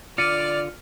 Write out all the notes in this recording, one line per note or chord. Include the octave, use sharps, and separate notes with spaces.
D3 F4 D5 F6 C#7 D#7